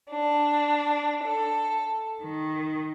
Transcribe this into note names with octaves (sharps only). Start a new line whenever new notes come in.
D4
A4
D#3